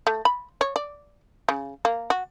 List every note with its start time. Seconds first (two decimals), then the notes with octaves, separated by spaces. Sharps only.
0.07 A3
0.25 B5
0.61 C#5
0.76 D5
1.49 C#3
1.85 A#3
2.10 F#4